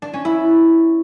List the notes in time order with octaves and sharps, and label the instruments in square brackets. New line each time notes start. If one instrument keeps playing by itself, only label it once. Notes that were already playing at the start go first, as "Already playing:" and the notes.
[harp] D4
C#4
E4